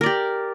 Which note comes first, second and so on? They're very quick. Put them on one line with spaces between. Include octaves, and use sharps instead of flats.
A#4 D5 G4